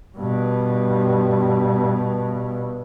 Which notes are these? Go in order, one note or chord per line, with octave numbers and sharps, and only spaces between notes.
G2 B2